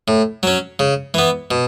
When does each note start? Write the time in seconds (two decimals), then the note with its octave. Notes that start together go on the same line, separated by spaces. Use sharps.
0.08 A2
0.43 F#3 C#4
0.79 C#3
1.14 E3 B3
1.51 B2